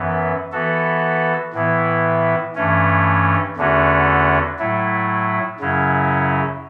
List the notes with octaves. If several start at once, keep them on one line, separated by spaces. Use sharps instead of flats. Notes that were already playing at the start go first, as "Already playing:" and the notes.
Already playing: F#2 E3 B3
E3 B3 F#4 A4
A2 E3 B3 E4
G2 E3 A3 C#4
E2 D3 A3 C#4 F#4
A2 F#3 A3 E4
F#2 C#3 F#3 C#4 E4